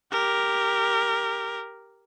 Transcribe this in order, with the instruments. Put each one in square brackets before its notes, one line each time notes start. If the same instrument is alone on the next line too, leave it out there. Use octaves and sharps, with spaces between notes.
[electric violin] G4 A#4